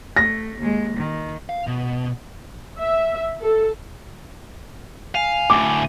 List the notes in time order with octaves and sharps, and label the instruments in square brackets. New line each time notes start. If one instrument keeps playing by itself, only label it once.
[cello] A3 [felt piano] A#6
[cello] D#2 G#3
D#3
[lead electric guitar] F5
B2
[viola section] E5
A4
[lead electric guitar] F5 [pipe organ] G#5
[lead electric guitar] D2 A2 [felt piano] D6